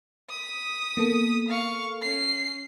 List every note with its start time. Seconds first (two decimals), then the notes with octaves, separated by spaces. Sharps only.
0.30 D#6 B6
0.97 A#3 B3 A4
1.48 F5 C#6
2.02 C#4 C7